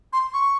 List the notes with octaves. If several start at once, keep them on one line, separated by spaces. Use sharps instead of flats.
C6
C#6